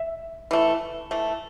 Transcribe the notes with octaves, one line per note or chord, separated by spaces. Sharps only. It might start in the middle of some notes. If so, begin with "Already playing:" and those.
Already playing: E5
E3 A3
E3 A3